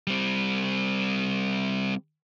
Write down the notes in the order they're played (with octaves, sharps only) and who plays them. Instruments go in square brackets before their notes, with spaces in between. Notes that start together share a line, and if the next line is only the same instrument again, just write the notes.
[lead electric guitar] G3 C4